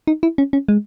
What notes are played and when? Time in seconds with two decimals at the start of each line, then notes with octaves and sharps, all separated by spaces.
0.07 D#4
0.23 E4
0.38 C#4
0.53 C#4
0.68 G#3